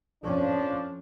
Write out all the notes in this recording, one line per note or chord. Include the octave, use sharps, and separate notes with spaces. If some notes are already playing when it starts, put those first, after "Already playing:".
F2 F3 C#4 D4